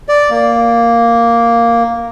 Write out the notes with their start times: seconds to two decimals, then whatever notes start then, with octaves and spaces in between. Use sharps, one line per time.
0.09 D5
0.30 A#3